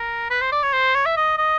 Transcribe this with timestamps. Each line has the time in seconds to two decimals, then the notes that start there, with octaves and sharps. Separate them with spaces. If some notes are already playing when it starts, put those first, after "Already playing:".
Already playing: A#4
0.30 B4
0.41 C5
0.52 D5
0.63 C#5
0.73 C5
0.95 C#5
1.06 E5
1.17 D#5
1.38 D#5